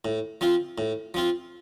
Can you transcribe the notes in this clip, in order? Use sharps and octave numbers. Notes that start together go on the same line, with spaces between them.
A2
F3 C4 F4
A2
F3 C4 F4